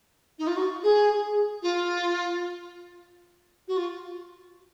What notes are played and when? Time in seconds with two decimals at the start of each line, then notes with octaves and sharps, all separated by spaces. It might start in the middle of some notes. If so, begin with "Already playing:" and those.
0.38 D#4
0.47 F4
0.56 F#4
0.83 G#4
1.62 F4
3.68 F#4
3.76 F4